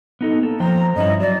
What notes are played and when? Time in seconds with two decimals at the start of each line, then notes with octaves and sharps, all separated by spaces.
0.21 B3 D#4 A4
0.39 A#3 A4
0.60 F3 C5 G5 A#5
0.96 G2 C#4 E4 D#5
1.20 F#3 D5